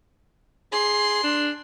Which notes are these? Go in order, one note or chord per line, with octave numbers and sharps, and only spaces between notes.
G#4 C6
D4